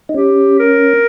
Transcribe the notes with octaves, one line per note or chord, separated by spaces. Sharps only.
D#4
C#4 G4
A#4